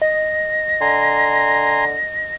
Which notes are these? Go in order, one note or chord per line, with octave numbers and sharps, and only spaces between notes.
D#5 A#6
D3 G#5 A#5 C6